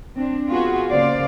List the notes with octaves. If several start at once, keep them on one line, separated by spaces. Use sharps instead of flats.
C4 D4
B3 F4 F#4 G#4
C#3 A#3 C5 D5 F5